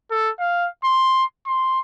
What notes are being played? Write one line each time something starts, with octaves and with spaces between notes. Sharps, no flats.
A4
F5
C6
C6